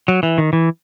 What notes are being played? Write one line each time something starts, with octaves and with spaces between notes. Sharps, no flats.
F#3
E3
D#3
E3